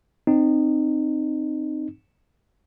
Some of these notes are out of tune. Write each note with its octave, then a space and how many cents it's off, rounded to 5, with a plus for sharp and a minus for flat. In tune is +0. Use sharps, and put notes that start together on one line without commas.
C4 +0 D#4 -25